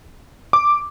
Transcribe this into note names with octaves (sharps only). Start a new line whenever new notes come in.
D6